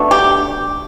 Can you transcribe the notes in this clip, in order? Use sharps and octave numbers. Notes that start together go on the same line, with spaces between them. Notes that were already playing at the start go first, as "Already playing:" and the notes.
Already playing: B2 A3 D4
G4